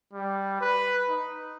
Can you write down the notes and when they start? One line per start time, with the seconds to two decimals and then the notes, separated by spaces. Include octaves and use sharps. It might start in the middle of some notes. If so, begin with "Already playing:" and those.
0.13 G3
0.61 B4
1.09 D#4